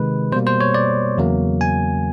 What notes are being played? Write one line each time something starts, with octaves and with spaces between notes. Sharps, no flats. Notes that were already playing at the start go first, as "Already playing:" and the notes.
Already playing: C3 D#3 G#3 B4
B2 G3 A#3 C5
C5
C#5
D5
E2 C#3 F#3 A#3
G#5